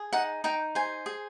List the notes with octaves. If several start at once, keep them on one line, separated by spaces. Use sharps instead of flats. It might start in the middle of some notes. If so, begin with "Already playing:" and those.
Already playing: G#4
D#4 F#5
D#4 G5
C5 G#5
G#4